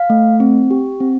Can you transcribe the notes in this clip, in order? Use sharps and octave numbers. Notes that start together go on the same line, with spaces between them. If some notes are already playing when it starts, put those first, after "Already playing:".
Already playing: F5
A3
C4
G4
C4